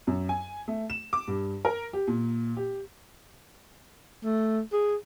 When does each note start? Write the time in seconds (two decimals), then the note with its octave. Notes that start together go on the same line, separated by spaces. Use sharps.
0.07 F#2
0.29 G#5
0.68 A3
0.90 E7
1.13 D6
1.28 G2
1.65 A#4
1.93 G4
2.08 A#2
2.57 G4
4.24 A3
4.73 G#4